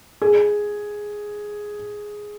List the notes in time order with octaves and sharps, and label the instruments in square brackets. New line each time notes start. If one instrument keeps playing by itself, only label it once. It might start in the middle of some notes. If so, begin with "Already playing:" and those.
[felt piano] G#4